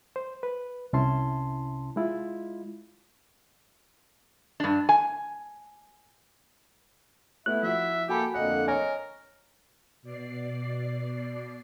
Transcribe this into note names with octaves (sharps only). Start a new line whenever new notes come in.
C5
B4
C2 C3 C#4 E4 A5 C6
G#3 E4 F4
G2 D4
G#5
A3 B3 E4 F#6
F3 F#4 E5
A#3 F#4 G4 A4 G#5 B5
F2 D3 A#3 D#5 F#5
A#4 C#5 D#5 G#5
B2 D5 C7